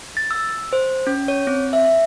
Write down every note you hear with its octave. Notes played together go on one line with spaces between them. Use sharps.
A6
E6
C5
C#4
C#5
C4
E5
E5